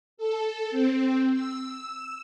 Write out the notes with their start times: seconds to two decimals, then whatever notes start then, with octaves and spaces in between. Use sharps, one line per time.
0.17 A4
0.70 C4
1.33 E6